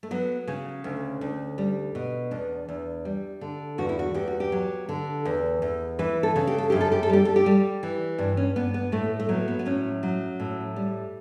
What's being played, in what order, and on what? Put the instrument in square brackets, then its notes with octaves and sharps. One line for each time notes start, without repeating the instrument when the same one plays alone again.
[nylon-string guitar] A3
F#3 B3
C#3 C#4
D2
D2
G3
B2
E2 D4
E2
G3
D3
E2 F#4
E4
F#4
E2 G4
F#4
G4
F#3
D3
E2
E2
E3 B4
A4
C#3
G4
A4
F#2 G4
A4
G4
A4
G3 G4
A4
G4
G3
E3
G2 D4
C#4
G2 B3
B3
A2 A3
A3
F#3 B3
B3
B3
A2 C#4
F#3
A2
G3